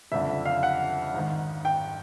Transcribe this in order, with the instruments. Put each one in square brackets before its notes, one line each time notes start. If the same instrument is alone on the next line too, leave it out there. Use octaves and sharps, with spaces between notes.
[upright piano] F#1 F2 D3 E5
F5
F#5
G#1 G#2 D#3
G5